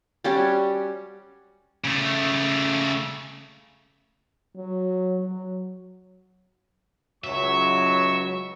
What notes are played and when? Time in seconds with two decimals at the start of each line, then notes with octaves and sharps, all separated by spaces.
0.24 G3 C#4 F#4 G4
1.84 C#3 A3
4.56 F#3
5.19 F#3
7.24 C#2 F#3 E5 C#6